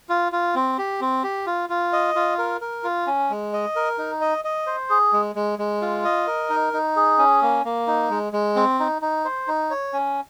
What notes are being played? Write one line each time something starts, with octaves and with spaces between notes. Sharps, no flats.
F4
F4
C4
G4
C4
G4
F4
F4
D#5
F4
A#4
A#4
F4
C#4
G#3
D#5
A#4
D#4
D#5
D#5
C5
G#4
G#3
G#3
G#3
F4
D#5
A#4
D#4
D#4
G#4
C#4
A#3
A#3
D#4
G#3
G#3
C4
D#4
D#4
C5
D#4
C#5
C#4